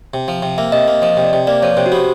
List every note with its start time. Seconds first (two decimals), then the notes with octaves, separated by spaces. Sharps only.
0.14 C3
0.28 F3
0.42 C3
0.58 A#3 E5
0.72 C3 D#5
0.87 A#3 D#5
1.02 F3 D#5
1.17 C3
1.25 D5
1.33 C3
1.47 A#3 D5
1.62 F3 C#5
1.77 C3 C5
1.86 F#4
1.92 B3 G4